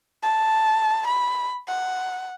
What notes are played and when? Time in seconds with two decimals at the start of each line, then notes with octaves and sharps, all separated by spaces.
0.23 A5
1.07 B5
1.68 F#5